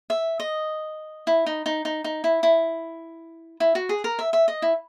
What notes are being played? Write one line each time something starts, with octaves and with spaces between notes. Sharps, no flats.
E5
D#5
E4
D#4
D#4
D#4
D#4
E4
E4
E4
F#4
G#4
A#4
E5
E5
D#5
E4